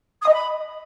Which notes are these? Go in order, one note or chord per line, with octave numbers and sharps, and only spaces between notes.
D#6
D#5
B5